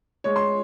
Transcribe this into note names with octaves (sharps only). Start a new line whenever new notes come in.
G#3 C#5
C6